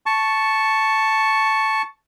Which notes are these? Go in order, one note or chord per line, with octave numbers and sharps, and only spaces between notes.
A5 C#6